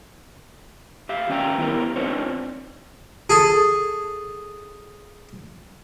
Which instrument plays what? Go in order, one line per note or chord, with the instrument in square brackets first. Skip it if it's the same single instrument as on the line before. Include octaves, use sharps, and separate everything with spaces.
[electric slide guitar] G4 E5 F5
D#3 C#4 D5 E5 G5 A#5
B3 E4 F4 G4 A#4
C4 D4 D#4 F4 C5 C#5
[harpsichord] G#4 A4